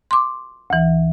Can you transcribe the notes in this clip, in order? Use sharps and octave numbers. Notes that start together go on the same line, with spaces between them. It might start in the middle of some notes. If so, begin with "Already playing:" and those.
C6 D6
D2 E3